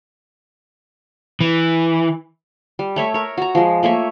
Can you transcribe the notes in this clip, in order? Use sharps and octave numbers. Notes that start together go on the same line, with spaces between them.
E3
G3
A3 C#5 E5
A#4 C#5
F#4 A#5
F3 G#3
A3 A#3 C#5 E5